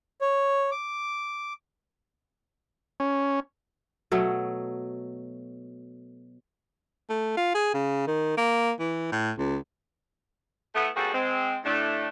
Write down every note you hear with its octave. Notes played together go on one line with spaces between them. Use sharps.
C#5
D6
C#4
B2 F#3 A3
A3
F4
G#4
C#3
D#3
A#3
E3
A2
C#2
A3 B3 E4
G3 A#3 C4 F#4 G#4 A4
G#3 C4
A2 A3 D4